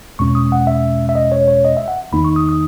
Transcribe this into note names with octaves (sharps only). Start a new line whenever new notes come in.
E2 B2 G#3 C#4 C#6
D#6
F#5
E5
E5
D#5
C#5
C#5
D#5
E5
F#5
E2 D#3 A#3 D#4 B5
C#6
D#6
D#6